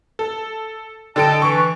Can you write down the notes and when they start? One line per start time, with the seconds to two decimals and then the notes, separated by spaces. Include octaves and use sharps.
0.19 A4
1.16 D3 A4 D#5 G5 A5 D7
1.42 E3 C#6